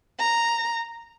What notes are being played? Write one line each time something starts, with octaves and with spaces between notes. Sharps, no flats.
A#5